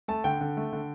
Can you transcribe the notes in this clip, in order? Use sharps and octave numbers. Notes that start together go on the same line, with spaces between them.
A3 A5
D3 G5
D3
A3
D3